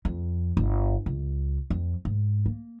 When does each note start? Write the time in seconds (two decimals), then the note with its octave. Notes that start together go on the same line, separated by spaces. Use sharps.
0.05 F2
0.57 G1
1.06 C#2
1.70 F2
2.05 G#2
2.46 A#3